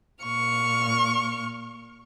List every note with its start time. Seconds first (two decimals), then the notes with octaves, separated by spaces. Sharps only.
0.24 A#2 C#6 F6